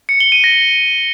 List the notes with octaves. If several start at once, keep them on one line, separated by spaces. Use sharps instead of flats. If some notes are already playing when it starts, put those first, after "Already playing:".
C#7
G7
D#7
A#6